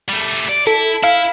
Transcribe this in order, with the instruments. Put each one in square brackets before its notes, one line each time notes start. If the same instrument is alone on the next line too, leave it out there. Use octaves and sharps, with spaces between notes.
[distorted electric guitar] G3 A3
D5
[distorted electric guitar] E4 [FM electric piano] A4
[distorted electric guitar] E4 [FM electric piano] F5